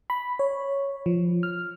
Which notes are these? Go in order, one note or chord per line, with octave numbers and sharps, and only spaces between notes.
B5
C#5
F3
F6